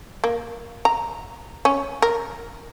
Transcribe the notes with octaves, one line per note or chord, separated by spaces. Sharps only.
A#3
A#5
C#4
A#4